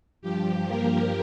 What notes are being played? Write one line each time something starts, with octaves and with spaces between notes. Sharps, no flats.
G2 F3 G4
A#3 A#4